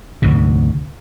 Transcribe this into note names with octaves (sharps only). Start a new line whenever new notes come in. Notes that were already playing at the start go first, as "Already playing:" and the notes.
D2 G#2 C3